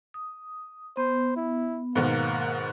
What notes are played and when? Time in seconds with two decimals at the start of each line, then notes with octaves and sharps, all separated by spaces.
0.14 D#6
0.97 B3 C5
1.36 E4
1.95 G#2 B2 D#3 A#3